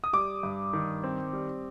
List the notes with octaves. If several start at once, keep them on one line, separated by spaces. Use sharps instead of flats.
D#6
G3 D6
G2
D#3
C4
G3